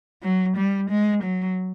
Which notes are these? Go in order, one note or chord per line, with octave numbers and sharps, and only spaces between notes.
F#3
G3
G#3
F#3